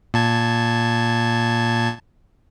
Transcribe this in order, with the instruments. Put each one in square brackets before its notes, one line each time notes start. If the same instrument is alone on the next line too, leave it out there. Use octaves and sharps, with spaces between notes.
[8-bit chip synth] A#2 A5 G#6